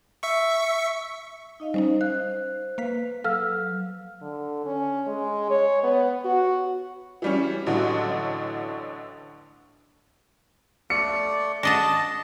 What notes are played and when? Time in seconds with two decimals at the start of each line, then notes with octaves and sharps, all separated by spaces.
0.23 E5 C#6
1.60 D#4 D#5 F5
1.74 G3 C#4 D#4 C5
2.01 F5 F#6
2.78 A#3 B4 F5 B6
3.24 F#3 A4 F5 E6 F6
4.22 D3
4.66 C#4
5.07 G#3
5.50 C#5
5.83 B3
6.25 F#4
7.22 E3 G3 C#4
7.66 A1 A2 D3 F#3
10.90 A3 D5 C#7
11.63 D4 D#5 F#5 A5 D#6 A6 A#6